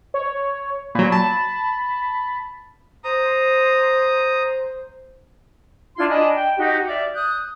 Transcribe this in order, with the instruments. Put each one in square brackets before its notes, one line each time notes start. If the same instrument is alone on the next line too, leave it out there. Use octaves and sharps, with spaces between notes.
[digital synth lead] C#5
[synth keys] A#2 F#3 [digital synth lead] B5
[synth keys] A5
[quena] C5 [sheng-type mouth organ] A#5 D#6
[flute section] D4 E4 F4 C6
D4 D#5 G#5 B5
G5
D#4 F#4 G4
D5 E5 D6 F6
D#6 F#6 G6